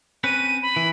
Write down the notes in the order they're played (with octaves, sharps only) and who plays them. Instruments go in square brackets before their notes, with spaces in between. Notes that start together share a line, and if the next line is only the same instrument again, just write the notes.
[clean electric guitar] C4 C#4 B4 [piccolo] D#7
[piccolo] B5
[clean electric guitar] E3